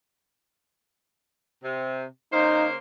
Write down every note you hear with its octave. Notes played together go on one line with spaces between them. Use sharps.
C3
C#3 A#3 D#4 C5